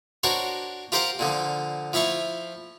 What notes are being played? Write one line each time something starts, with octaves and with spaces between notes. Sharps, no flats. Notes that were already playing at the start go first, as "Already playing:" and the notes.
D4 F#4 A#4 C5 C#5
F4 G4 A#4 C5 F5 F#5
A#2 D3 F3
F3 E4 F4 F5 C#6